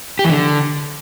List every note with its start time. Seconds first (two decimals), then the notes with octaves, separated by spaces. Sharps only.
0.19 G4
0.24 E3
0.30 D3